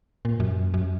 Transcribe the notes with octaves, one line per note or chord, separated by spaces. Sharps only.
A#2
F#2
F#2